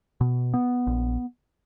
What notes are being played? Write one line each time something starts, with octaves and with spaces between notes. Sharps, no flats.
B2
B3
A#1